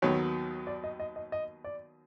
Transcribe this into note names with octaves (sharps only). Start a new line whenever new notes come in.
D#2 D#3 F#3 B3 C#5
D5
D#5
D#5
D#5
D#5
D5